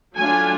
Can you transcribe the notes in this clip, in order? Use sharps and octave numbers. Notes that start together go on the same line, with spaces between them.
F#3 A3 D4 F4 G#5